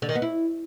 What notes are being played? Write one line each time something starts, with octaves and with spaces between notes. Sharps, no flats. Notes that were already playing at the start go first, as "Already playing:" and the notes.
D3
D#3
B3
E4